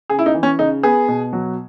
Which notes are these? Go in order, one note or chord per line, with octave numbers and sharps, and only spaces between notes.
C#3 G#4
E4
D#4
E3
C#4
C#3 D#4
B3 G#4
B2
F#3